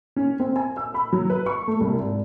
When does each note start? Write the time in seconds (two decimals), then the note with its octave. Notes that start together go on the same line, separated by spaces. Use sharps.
0.16 C#4
0.40 C4
0.56 G#5
0.77 E6
0.94 B5
1.13 F#3
1.30 B4
1.46 C#6
1.67 A3
1.80 C2
1.99 G#1